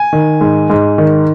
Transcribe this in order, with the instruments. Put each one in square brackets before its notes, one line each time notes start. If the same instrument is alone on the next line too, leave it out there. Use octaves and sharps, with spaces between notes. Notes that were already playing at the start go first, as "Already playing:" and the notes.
Already playing: [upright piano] G#5
D#3
G#2
G#2
D#3